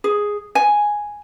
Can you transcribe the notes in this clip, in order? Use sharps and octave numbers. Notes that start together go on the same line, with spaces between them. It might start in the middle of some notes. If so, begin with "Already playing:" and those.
G#4
G#5